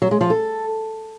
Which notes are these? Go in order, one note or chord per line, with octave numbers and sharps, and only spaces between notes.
F#3
G#3
F3
A4